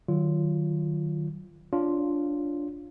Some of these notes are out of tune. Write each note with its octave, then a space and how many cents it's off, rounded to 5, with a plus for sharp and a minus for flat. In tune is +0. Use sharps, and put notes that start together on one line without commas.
D#3 -25 F#3 +15 F4 -10
D4 -10 F4 +0 C#5 +0